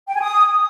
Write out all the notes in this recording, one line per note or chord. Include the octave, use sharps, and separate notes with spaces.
G5
G#5
D#6